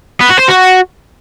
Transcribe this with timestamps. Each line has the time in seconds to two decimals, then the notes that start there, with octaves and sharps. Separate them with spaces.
0.21 B3
0.30 F#4
0.39 C5
0.49 F#4